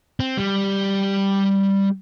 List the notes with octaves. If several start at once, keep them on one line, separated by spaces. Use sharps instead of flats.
C4
G3